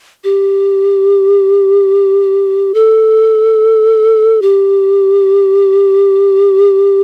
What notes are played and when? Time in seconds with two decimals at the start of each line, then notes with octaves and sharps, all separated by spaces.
0.24 G4
2.74 A4
4.42 G4